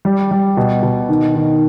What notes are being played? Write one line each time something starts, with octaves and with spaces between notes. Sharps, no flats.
G3
G3
B2
B2
D#3
D#3